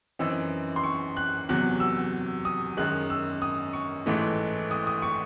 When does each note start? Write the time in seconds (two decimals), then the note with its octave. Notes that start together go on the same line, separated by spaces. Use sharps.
0.19 F#2 E3 C4 D#4 E6
0.76 C6
0.84 C#6
1.17 F#6
1.49 E2 C3 F#3 F#6
1.80 E6
2.45 D#6
2.77 F#2 D#3 G#3 F#6
3.10 E6
3.42 D#6
3.73 C#6
4.06 A1 G#2 E3 A3
4.71 D#6
4.87 D#6
5.02 C#6